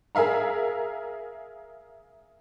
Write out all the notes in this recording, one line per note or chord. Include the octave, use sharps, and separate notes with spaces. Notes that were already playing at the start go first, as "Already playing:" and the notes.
G#4 A#4 E5 F5 A#5